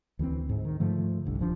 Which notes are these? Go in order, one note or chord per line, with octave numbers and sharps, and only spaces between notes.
D2 E3 G3 C4
G#2
D#3
G#2 D3 F3 A3
F#1 C2 D3
D#1 F3 D4